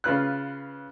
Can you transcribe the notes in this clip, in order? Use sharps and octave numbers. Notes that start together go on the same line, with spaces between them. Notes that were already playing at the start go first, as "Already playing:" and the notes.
C#3 F4 B4 F#6